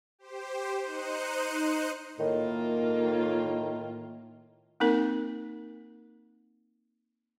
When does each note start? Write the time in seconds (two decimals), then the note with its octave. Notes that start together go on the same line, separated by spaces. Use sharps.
0.19 G4 C5
0.80 D#4 C5 F#6 C#7 D#7
2.19 A2 D#3 A#3 F4
4.80 A#3 C4 D#4 A#4